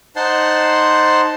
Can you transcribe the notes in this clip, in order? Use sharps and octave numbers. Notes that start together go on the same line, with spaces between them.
D#4 C5 F#5 A5 C6